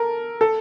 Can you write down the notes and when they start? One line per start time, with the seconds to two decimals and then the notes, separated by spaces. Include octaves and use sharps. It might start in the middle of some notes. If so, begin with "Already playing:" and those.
Already playing: A4 A#4
0.41 A4